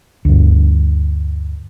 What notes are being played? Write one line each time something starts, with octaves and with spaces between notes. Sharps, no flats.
D2 G2